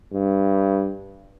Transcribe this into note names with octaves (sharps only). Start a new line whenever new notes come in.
G2